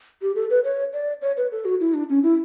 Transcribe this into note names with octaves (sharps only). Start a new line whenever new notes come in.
G4
A4
B4
C#5
D5
C#5
B4
A4
F#4
E4
D4
C#4
E4